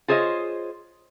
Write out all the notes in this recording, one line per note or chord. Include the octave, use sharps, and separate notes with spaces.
F4 G#4 C5 C#5 D#5